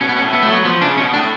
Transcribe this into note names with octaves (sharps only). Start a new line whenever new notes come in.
B2 C#4
B3
C#4
A2
B3
F#3 A3
B3
F3 B3
C#3 D4
B2 C#4
A2 D4